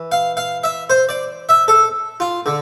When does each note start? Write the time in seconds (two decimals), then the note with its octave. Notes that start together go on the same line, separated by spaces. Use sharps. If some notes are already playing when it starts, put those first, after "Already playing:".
Already playing: E3
0.12 F5
0.37 F5
0.64 E5
0.90 C5
1.09 D5
1.49 E5
1.68 A4
2.20 F4
2.46 D3